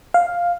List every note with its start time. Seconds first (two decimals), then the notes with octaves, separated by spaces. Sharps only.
0.14 F5